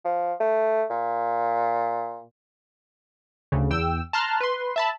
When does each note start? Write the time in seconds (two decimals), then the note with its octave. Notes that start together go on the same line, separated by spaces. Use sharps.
0.05 F3
0.40 A3
0.90 A#2
3.52 D2 C#3
3.70 E2 G5 E6
4.13 A5 A#5 C6 F6 F#6
4.40 B4 C6
4.76 E5 A5 B5